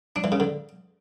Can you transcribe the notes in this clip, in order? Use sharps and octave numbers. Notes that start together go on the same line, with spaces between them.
D4
E3
C#3
D3